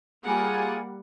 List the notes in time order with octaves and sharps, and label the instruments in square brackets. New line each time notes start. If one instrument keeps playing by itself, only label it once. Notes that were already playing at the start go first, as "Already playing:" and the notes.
[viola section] G3 A#3 F#5 [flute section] F4 G#4 G#5